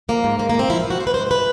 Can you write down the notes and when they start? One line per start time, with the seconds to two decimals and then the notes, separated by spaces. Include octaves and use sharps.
0.09 F3 A#3
0.24 G#2
0.39 G#2 A#3
0.49 A#3
0.54 F3 C4
0.69 F3 E4
0.80 F4
0.84 F3
0.90 F#4
1.00 F3 C5
1.07 B4
1.14 G#2 C5
1.27 C5
1.30 E3 B4